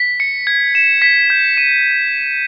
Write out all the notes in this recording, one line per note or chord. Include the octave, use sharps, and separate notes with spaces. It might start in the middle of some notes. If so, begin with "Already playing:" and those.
Already playing: B6
C#7
G#6
E7
B6
G6
D#7